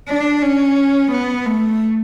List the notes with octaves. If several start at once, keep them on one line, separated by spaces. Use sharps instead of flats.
D4
C#4
B3
A3